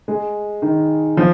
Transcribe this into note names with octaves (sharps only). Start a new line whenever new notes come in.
G#3
D#3
F3